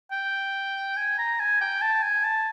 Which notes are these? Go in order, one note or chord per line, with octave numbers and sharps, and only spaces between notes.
G5
G#5
A#5
G#5
G5
A5
G#5
A5